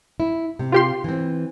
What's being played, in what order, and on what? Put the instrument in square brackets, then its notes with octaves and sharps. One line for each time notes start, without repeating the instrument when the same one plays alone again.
[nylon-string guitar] E4
C3
[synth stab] F4 G4 C6
[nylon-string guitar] E3 C4